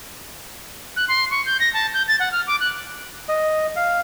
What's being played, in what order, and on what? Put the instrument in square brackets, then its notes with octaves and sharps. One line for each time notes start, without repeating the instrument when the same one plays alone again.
[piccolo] F#6
C6
C#6
G6
A#6
A5
G6
A6
F#5
F6
D6
F#6
[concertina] D#5
F5